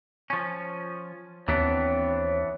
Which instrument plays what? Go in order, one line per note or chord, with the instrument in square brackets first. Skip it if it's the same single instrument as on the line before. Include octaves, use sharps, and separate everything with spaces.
[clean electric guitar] F3 C#4
[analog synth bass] D#2 [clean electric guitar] E3 B3 D4 [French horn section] C4 C#5